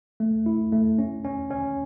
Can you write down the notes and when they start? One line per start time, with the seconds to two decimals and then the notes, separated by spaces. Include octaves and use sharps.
0.20 A3
0.46 E4
0.72 A3
0.99 C#4
1.25 C#4
1.50 C#4